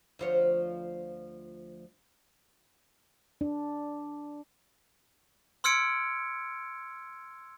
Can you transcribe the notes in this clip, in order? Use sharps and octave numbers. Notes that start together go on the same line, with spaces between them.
D2 F3 C#5
D4
C6 E6 F6 G#6 C#7 D7